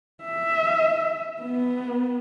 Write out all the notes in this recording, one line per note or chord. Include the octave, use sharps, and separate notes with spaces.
E5
B3